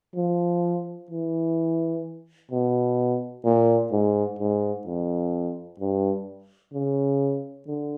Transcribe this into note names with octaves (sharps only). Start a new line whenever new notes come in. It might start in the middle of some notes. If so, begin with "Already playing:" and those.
F3
E3
B2
A#2
G#2
G#2
F2
G2
C#3
D3